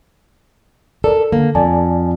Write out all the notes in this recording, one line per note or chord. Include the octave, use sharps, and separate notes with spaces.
A4 A#4 D5
D3 A#3
F2 D5 G#5 A5